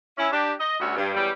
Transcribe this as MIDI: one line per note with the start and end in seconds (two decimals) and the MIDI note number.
0.18 0.28 61
0.18 0.28 64
0.33 0.53 62
0.33 0.53 67
0.60 0.77 75
0.80 0.95 38
0.80 0.95 55
0.80 0.95 61
0.80 0.95 66
0.80 0.95 76
0.97 1.11 43
1.15 1.30 40
1.15 1.30 54
1.15 1.30 55